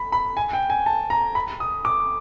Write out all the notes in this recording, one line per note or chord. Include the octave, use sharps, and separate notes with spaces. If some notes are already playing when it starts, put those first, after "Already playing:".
Already playing: B5
B5
G#5
G5
G#5
A5
A#5
B5
D#6
D6